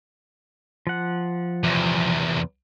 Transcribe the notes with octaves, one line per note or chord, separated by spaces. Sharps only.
F3 F#5
E2 C3